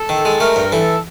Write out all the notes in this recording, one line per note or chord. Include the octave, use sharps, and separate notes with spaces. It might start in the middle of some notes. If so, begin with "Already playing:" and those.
Already playing: A4
D#3
G#3
A3 A#4
G2
E3 A4